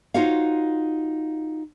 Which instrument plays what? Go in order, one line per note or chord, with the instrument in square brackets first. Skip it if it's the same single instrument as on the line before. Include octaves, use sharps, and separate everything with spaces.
[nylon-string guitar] D#4 F4 F#4 C5 C#5 F5